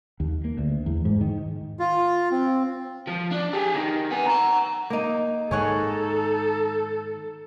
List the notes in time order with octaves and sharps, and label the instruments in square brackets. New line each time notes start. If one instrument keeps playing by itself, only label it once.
[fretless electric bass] D#2
A#3
D2
E2
G#2
D#3
[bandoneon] F4
C4
[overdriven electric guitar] F3
D4
G4 G#4
D#3
B3 G#5
F#5 A#5
[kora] A#3 D#4
[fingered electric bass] G#2 D#3 [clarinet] D#4 [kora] G#4 C#5 F#5 [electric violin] A4